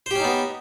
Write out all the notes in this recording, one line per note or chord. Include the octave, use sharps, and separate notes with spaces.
B3 C#4 D#4 G4 C5